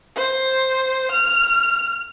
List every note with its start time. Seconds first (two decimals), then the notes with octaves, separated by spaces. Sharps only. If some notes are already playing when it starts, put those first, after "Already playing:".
0.15 C5
1.11 F6